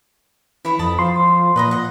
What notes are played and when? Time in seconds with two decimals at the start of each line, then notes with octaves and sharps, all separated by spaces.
0.65 E3 E4 C#5 B5
0.79 F2 A5 B5 D#6
0.99 F3 C6
1.56 A#2 B4 D#5 A#5
1.71 D#5 F#5